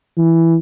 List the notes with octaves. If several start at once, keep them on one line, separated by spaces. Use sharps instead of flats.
E3